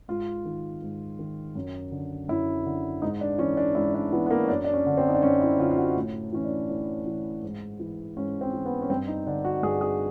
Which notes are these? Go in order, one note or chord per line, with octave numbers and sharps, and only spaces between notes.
G#2 F4
D#3
G#2
D#3
F#2
D3
F#2 E4
D3
G#2 D#4
D4
E3 C#4
D4
G#2 E4
D4
E3 B3
B3
A#3
C#4
F#2 D4
D4
C#4
D3
C4
D#4
D4
F#2 C#4
E4
D3 F4
F4
F#4
A2
E3 C#4
D4
A2
E3
G#2
E3
G#2 C#4
C4
E3
B3
C#4
G2 C4
D#4
D3 D4
F#4
G2 G#4
G#4